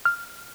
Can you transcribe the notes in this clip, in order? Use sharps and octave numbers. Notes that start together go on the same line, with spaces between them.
F6